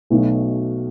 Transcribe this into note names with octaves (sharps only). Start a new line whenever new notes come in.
B1 B2 A3